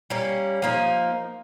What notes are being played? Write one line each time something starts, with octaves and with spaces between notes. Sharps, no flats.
G3 A#3 C#4
F3 A#3 D#4